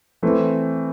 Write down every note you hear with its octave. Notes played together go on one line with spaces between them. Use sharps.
E3 A3 C4